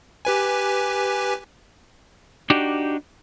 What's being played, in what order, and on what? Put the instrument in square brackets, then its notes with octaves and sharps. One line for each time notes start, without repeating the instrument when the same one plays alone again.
[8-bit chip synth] G4 B4 G#5
[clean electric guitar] D4 D#4 F#4 G4